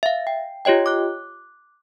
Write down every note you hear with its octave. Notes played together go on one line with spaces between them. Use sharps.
E5 F5
G5
F4 G4 C#5 D#5 G5
D6 F#6